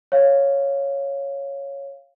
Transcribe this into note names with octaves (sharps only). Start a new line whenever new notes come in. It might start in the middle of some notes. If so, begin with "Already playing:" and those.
C#5 F5